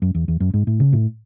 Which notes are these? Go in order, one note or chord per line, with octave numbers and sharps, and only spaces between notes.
F#2
E2
E2
F#2
G#2
A2
C#3
A2